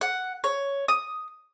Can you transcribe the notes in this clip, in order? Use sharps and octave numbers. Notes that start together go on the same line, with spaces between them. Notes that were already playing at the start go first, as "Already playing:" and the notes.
F#5
C#5
D#6